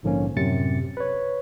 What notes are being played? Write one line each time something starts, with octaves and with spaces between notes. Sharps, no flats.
A#1 G#2 D3 F3 A#3 C#4
F#2 A2 C3 A6 C#7
B4 C#5